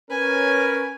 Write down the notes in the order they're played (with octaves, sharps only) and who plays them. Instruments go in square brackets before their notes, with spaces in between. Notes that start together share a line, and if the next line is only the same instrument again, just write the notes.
[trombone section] C#4 [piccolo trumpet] A#4 [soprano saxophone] B4 [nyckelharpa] G#5